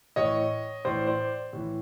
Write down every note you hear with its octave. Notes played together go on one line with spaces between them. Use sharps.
A2 E3 C#5 D#5
A2 E3 C5 D5
C5 D5
A2 E3